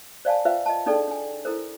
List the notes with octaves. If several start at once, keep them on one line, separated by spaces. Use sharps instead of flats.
C5 D5 F5 G#5 A5
F4 B4 C5 E5 F5 G5
D#5 A5
D4 D#4 G#4 A4 D5 G5
D4 G#5
E4 A4 A#4 C5